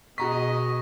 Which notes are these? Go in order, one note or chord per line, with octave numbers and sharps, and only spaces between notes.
B2 F#4 G#4 D#5 A#5 C#6 B6